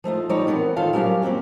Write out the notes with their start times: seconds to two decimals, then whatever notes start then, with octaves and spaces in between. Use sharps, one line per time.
0.04 F3 A3 D#4 F4
0.29 F3 G3 D#4 G4 C#5 D5
0.47 E3 B3 C4 A#4
0.76 E2 D#3 F4 A4 F5
0.93 F#3 G3 C#4 G4 A#4 F5
1.22 A#3 C4 D4 F#4 G4